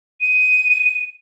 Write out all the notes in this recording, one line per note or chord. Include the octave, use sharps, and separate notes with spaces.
D#7